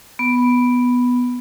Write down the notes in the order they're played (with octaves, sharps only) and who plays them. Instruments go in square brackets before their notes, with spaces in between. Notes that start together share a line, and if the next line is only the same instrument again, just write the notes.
[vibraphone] B3